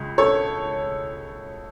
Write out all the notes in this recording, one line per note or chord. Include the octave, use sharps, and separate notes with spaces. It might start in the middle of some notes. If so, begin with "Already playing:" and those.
Already playing: C#2 C#3
A4 C#5